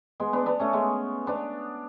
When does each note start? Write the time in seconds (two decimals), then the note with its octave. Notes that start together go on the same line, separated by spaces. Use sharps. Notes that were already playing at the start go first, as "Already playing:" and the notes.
0.20 G#3 B3
0.33 B3 D4
0.46 B3 D4
0.60 A3 C#4
0.73 G#3 B3
1.27 B3 D4